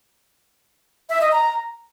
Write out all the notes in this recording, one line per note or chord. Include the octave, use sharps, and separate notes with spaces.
E5
D#5
A#5